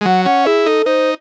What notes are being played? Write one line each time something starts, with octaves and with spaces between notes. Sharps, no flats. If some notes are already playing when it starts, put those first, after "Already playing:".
G#3
F#3 F#5
C#4 F#5
E4 G#4
D#4 A4
D#4 C5